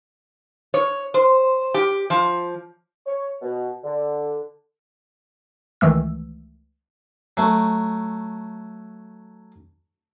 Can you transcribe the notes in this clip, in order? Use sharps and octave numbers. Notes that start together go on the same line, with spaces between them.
C#5
C5
G4
F3
C#5
B2
D3
C#2 D#3 E3 A3 E6
F#3 A3